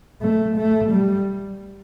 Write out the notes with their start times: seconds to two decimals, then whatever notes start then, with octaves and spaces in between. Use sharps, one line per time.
0.22 A3
0.56 A3
0.92 G3